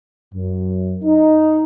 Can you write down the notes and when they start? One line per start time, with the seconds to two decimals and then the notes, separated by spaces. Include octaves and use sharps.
0.34 F#2
1.03 D#4